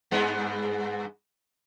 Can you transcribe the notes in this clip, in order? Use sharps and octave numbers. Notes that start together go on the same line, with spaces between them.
G2 G#3 B3